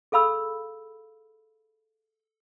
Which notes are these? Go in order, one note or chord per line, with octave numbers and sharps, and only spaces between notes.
G#4 A4 F5 B5 E6